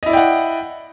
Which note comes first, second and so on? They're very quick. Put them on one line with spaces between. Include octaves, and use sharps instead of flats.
D#5 E4 D5 G5 F#5